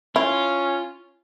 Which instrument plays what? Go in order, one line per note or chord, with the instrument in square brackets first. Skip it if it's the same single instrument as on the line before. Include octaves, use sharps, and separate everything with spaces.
[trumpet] C#4 [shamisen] E4 [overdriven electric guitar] F4